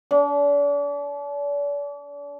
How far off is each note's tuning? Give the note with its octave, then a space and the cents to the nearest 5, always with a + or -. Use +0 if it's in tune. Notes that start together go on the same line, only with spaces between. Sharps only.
D4 -40